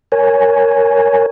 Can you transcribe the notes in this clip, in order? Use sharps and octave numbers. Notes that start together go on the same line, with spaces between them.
A#4 C#5 G#5